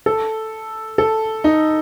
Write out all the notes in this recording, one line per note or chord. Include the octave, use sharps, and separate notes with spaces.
A4
A4
D#4